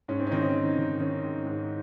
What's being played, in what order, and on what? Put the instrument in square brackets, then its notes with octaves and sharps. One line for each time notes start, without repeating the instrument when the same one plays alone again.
[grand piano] G#2 C#4
C4
C#4
D#3 C4 D#4
C#4
D#3
D#3
D#3 C#4
G#2
G#2